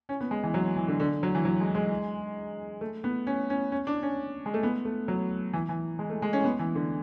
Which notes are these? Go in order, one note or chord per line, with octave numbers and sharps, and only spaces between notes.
C#4
B3
G#3
E3
F#3
E3
D3
D3
F#3
E3
F#3
G#3
G#3
A3
B3
C#4
C#4
C#4
D4
C#4
G#3
A3
B3
A3
F#3
E3
E3
G#3
A3
G#3
C#4
B3
E3
D3